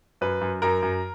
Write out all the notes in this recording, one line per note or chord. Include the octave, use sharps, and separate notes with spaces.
F#2 B4
F#2
F#2 A#4
F#2